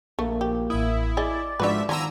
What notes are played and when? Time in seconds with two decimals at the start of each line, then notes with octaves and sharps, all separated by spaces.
0.19 A#1 A3 A#3
0.41 G4
0.70 A1 E4 E5 D#6
1.17 G#4 D5 D#5 A6
1.60 G#2 F3 D4 F#4 B4 E5
1.89 D#3 F3 B3 F4 G#5 A#5 E6